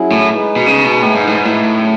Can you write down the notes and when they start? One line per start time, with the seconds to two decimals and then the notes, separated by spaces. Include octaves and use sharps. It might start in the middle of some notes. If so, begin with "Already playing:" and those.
Already playing: F#3 C#4 E4 G#4
0.12 A2
0.30 G#3 D#4 G#4 B4
0.56 B2
0.66 C#3
0.84 B2
1.02 A2
1.15 G#2
1.27 A2
1.36 G#2
1.45 A2
1.76 C#3 F#3 C#4 G#4 C#5